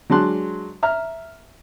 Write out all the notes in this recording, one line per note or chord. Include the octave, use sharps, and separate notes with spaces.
F#3 G#3 D4 A5 C6 F#6
E5 A#5 F6